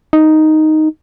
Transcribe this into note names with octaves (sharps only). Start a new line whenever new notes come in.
D#4